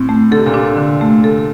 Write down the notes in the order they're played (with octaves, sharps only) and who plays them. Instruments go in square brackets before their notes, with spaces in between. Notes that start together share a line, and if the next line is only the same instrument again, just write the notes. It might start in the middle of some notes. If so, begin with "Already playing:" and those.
Already playing: [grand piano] A2 [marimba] C4
[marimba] A3
[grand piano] D3 [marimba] A4
[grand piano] C3
A#2
[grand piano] C3 [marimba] D4
[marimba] D3
A3
A4